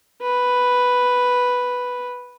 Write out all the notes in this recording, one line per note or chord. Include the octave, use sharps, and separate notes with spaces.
B4